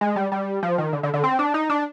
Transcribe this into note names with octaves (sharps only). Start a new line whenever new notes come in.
G#3
G3
G3
F3
D#3
D3
D3
D3
C4
D4
D#4
D4